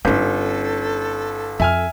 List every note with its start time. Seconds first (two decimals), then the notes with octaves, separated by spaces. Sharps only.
0.05 G1 C#4 D#4 A4
1.60 F2 E5 G#5 F6